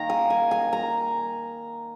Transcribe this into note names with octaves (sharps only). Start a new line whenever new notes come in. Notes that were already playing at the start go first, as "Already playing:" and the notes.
Already playing: D#3 A#3 A#5
G#5
G#5
G#5
A#5